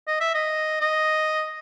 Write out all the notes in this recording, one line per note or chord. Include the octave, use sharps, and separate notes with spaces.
D#5
E5
D#5
D#5